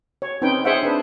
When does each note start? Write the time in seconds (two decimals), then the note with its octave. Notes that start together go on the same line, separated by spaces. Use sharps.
0.22 C#5
0.42 C4 C#4 D#4 B4 G5
0.64 G#4 C5 C#5 E5 F#5 G5
0.83 D4 B4